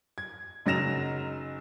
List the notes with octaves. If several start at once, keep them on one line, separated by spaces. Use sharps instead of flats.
G#6
F#1 F#3 D#4 A#6 E7 F7